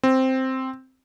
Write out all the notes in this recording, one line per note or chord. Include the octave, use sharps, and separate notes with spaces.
C4